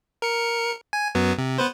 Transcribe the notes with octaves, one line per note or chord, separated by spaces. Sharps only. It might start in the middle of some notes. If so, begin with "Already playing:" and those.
A#4 C#7
G#5
F#2 F#3 B3
C3
B3 B4 C5